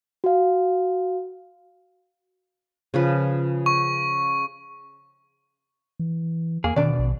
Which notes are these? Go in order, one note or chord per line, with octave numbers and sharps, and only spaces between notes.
F#4 F5
C#3 F3 B4
C#6
E3
E2 A#3 G#4
B2 D#3 D4 D5
A#1